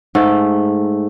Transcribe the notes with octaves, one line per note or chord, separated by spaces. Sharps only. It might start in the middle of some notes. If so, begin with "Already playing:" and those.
G#2 A3